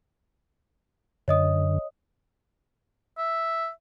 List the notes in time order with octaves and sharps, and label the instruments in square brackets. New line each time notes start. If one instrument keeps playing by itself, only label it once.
[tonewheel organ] F#2 D3 [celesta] C#5 D#5 D#6
[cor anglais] E5